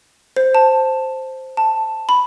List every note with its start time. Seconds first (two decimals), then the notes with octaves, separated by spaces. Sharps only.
0.37 C5
0.55 A5
1.57 A5
2.09 B5